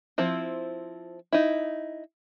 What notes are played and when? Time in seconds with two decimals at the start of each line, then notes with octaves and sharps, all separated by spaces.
0.18 F3 C4 E4
1.32 D#4 E4